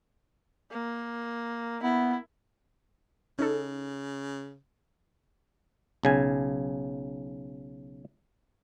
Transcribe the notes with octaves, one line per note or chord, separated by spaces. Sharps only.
A#3
B3 E4
C#3 C#4 D#4 A4
B1 C#3 G#5